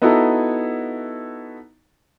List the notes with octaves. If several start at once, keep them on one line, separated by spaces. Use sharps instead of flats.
B3 D#4 E4 F#4 A4 A#5